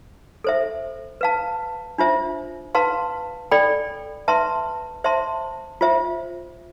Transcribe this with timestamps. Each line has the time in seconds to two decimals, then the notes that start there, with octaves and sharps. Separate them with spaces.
0.44 A4 C5 E5
1.21 B4 F5 A5
1.98 D4 F4 C5 E5
2.75 B4 F5 A5 C6
3.51 A4 D5 G5 B5
4.28 B4 E5 A5 C6
5.04 C5 E5 A5 C6
5.81 F4 C5 E5